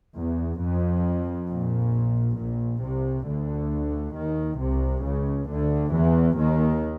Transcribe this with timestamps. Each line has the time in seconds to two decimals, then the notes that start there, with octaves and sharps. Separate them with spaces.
0.16 E2
0.60 F2
1.48 A#1 A#2
2.37 A#1 A#2
2.82 C2 C3
3.25 D2 D3
4.15 D#2 D#3
4.59 C2 C3
5.03 C#2 C#3
5.47 D2 D3
5.92 E2 E3
6.36 D#2 D#3